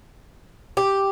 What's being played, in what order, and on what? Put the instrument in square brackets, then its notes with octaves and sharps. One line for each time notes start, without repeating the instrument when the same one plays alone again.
[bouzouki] G4